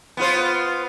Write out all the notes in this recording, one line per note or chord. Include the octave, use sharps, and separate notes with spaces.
B3 F4 C5